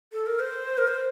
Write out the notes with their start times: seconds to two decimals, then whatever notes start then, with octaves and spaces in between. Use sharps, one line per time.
0.12 A4
0.26 A#4
0.40 C5
0.78 A#4
0.87 C5